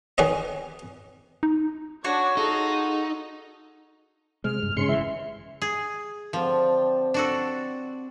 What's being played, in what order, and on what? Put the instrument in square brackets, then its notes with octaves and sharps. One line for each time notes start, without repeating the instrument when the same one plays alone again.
[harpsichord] D#3 G#4 B4 C#5 D#5
[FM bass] D#4
[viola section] D4 C#5 [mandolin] F#4
[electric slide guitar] D#4 [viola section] F4 G#4 A4
[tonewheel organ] C3 [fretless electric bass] G#3 [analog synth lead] F6
[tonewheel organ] G2
[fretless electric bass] G#2 C4 C#4 [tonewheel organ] C#3 G#3 C6 [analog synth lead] C#7
[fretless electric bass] G#1 E3 [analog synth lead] E5
[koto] G#4
[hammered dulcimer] D3 C4 G4 [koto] F3
[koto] D4 F#4 A4